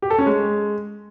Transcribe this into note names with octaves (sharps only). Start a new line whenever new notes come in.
G4
A4
C#4
G#3